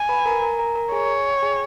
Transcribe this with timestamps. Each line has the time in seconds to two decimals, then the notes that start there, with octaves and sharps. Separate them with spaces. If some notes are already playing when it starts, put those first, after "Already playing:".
Already playing: G#5
0.09 B4 B5
0.26 A#4 A#5
0.42 A#4 A#5
0.59 A#4 A#5
0.75 A#4 A#5
0.92 G#4 C#5 G#5
1.30 G5
1.42 G#4 G#5